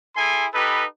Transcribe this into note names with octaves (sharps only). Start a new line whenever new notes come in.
E4 G#4 A4 G#5 C6
D#4 G4 A4 B4